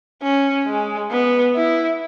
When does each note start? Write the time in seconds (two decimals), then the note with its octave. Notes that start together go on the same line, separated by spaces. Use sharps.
0.22 C#4
0.67 G#3
1.11 B3
1.55 E4